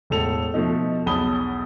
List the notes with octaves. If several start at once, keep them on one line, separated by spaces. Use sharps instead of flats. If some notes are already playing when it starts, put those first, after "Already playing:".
E1 A2 A4 F7
B2 F3 A3 D#4
B1 E2 A5 B5 D#6 G7